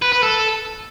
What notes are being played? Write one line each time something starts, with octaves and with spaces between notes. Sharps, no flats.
B4
B4
A4